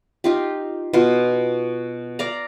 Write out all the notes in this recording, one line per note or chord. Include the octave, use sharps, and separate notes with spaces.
D#4 F4 G4
B2 F4
D5 F5 A#5